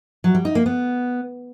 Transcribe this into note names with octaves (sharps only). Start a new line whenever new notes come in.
F#3
G3
D#4
A#3
B3